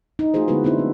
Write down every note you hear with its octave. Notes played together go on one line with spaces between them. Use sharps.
D#4
F3 A3 F4 F#4 G#4 C5
D3 G#3 B3 E4 F#4 B4
B3 C4 D4 E4 C5
F#3 A3